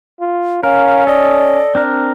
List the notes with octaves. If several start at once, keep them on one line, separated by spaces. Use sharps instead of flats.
F4
C#4 A#4 F5
A4 D5 D#5
C4 D4 A#4